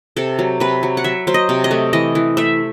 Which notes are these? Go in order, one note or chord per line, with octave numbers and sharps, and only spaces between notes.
C3 A4
F#3
C3 B4
F#3
F#5
F#3 E5
F#3 C5
D#5
C3
D#5
A3
E3 D#5
E3
A3 E5